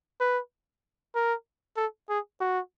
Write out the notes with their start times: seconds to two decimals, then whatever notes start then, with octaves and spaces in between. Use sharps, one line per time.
0.20 B4
1.15 A#4
1.77 A4
2.09 G#4
2.41 F#4